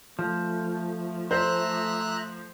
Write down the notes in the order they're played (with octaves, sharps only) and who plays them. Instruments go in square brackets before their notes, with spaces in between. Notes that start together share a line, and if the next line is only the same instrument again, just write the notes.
[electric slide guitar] F3 [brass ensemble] A3
[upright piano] C5 [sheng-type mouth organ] E5 A#5 F#6